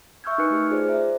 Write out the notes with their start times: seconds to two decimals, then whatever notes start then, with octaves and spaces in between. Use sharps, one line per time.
0.24 E5 C#6 E6 F6 G6 G#6
0.38 D#4 A#4 B4 G#5 F#6 C#7
0.50 A3 G4 F6
0.70 F4 G#4 C5 D5
0.88 C5 D5 E5 A#5